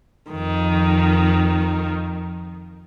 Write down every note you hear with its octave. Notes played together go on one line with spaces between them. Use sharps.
F2 D#3